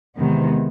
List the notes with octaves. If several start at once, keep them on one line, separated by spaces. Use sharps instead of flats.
E2 C3 D#3 G#3 B3